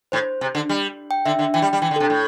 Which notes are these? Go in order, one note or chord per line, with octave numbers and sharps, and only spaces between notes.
A2 C5
C3
D3
G3
G5
D3 E5
D3
E3 G5
G3
G3
E3 G5
D3
A4
C3
A2